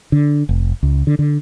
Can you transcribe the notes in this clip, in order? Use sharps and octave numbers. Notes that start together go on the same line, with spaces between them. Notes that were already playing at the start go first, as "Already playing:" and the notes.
D3
F1
C#2
D3
D3